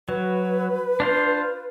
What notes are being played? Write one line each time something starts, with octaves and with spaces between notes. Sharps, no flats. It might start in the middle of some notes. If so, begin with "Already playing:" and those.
F#3 B4
D4 F4 C5